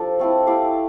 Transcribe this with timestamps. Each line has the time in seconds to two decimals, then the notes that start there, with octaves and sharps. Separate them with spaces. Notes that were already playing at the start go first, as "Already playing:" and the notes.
Already playing: F3 D4 G4 A4 D5
0.19 A3 C4 E4
0.47 E4 G4 D5 F5